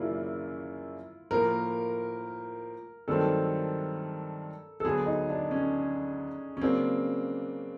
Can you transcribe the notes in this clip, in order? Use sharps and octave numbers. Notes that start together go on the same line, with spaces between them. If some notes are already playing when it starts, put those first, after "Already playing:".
Already playing: F#2 C#3 F#3 A#3 D4 E4 F4
A2 F3 A#3 A#4
G2 D#3 F#3 A3 C4 A4
A4
D2 D3 F#3 B3 G#4
D#4
D4
C#4
C#4
C#3 F#3 A#3 C4 D4